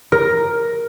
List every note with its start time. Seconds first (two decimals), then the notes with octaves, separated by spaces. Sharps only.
0.12 A#4